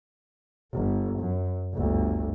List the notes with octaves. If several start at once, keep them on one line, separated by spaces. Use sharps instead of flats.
G1
F#2
G1 D2